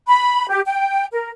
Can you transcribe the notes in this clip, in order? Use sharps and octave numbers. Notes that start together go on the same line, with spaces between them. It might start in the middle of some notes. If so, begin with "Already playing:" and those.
B5
G4
G5
A#4